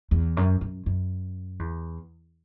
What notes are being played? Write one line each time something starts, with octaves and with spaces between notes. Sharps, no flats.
E2
F#2
F#2
F#2
E2